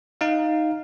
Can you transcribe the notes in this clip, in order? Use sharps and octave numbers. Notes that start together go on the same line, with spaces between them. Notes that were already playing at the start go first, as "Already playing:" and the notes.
D#4 F5